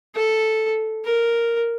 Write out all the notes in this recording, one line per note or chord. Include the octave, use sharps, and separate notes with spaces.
A4
A#4